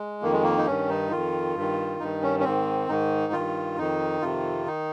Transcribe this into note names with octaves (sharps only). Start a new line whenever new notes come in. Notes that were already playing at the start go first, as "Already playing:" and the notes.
Already playing: G#3
F2 D#3 A#3
G#3
A#3
D#4
G2 D#3 C#4
D#4
F2 D#3 F4
G2
D#3
G2 D#3 D#4
C#4
C#4
G#2 D#3 C4
G#2 D#3 D#4
G2 D#3 F4
F2 D#3 D#4
F2 C3 D#3 F4
D#3 D#4